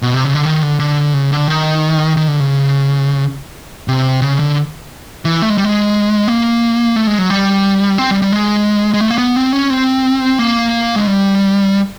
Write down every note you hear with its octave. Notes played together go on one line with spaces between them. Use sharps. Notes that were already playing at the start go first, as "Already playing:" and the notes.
B2
C3
C#3
D3
D#3
D3
D3
C#3
D3
D#3
D#3
D3
C#3
C3
C#3
D3
E3
A3
G#3
G3
G#3
A#3
A3
G#3
F#3
G3
C4
G3
G3
G#3
G#3
A3
A#3
B3
C4
C#4
C4
A#3
G#3
G3